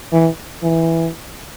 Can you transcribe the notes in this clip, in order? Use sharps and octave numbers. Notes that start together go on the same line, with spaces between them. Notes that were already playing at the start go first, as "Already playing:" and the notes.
E3
E3